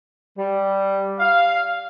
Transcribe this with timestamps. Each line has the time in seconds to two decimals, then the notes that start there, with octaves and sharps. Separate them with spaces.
0.38 G3
1.19 F5